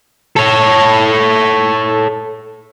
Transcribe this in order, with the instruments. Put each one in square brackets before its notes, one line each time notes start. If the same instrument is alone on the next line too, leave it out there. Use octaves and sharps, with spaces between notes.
[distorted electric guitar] A4 C#5